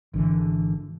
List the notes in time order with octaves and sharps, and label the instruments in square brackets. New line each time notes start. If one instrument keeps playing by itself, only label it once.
[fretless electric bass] G#1 D3 E3